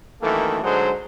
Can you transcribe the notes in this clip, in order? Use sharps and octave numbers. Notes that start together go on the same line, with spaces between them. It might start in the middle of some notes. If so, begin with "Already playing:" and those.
F#2 D#3 E3 A3 A#3 A4
D3 F#3 G#3 D#4 G#4 C5